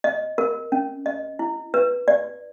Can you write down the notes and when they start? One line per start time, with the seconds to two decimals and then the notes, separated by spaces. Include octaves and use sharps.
0.04 D#5
0.38 A#4
0.72 C#4
1.06 D#5
1.39 E4
1.74 B4
2.08 D5